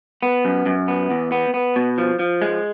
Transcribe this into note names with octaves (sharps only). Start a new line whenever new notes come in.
B3
F#2
F#2
B3
E2
B3
B3
B2
F3
F3
G#3